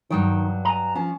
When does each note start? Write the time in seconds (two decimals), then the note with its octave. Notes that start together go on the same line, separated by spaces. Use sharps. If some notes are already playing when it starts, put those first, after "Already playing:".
0.10 G2 D#3 F#3 G5
0.65 G#5 A#5
0.95 F3 C#4